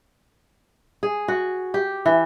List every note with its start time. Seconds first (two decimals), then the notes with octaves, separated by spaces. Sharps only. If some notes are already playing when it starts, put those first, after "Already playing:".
1.03 G#4
1.28 F#4
1.74 G4
2.06 E3